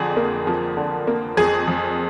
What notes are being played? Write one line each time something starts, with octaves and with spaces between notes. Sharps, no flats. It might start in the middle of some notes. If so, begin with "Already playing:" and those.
Already playing: F2 D3 G#4
A#3
F3
D3
A#3
F2 G#4
F2